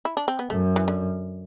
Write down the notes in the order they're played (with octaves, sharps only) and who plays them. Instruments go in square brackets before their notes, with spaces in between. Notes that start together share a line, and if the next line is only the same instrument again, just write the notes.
[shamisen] E4
D4
C4
B3
[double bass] F#2 [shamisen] A3
[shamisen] E3
D3